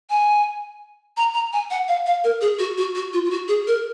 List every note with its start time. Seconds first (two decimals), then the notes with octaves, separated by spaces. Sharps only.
0.10 G#5
1.17 A#5
1.34 A#5
1.53 G#5
1.71 F#5
1.88 F5
2.06 F5
2.24 A#4
2.41 G#4
2.59 F#4
2.78 F#4
2.95 F#4
3.13 F4
3.25 F4
3.30 F#4
3.48 G#4
3.67 A#4